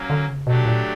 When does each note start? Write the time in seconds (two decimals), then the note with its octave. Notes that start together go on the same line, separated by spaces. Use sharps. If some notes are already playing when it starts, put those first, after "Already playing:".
Already playing: F#3 A#3 C#4
0.10 D3
0.28 C#3
0.47 B2 F#3 A3 D4 G4
0.66 A#2